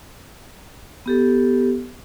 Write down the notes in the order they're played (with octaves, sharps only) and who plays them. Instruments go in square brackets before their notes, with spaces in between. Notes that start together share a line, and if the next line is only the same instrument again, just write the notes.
[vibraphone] B3 G4 A4